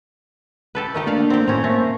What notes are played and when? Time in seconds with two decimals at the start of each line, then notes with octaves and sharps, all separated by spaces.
0.75 G4 A4 B4
0.94 A3 D#4 G4 A#4
1.07 A3 A#3 D4 D5 F5
1.30 C4 G4
1.48 A2 C4 C#4 C5 A#5
1.64 A3 A#3 C5